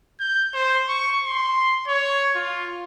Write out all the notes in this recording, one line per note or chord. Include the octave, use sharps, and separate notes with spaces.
G6
C5
C#6
C6
C#5
F4